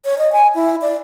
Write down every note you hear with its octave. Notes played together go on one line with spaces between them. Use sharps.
C#5
D#5
G#5
E4
D5